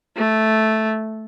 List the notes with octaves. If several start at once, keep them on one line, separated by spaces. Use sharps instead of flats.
A3